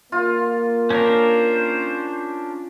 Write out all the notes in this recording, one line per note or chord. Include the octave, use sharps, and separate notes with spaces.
A#3 F4
C#4 D4 A#4 C5